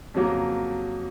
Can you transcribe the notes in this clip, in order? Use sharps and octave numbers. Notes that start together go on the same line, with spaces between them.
F2 C#3 F#3 A#3